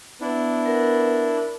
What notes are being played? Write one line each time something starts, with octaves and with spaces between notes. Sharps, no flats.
B3 D4 E4
A#4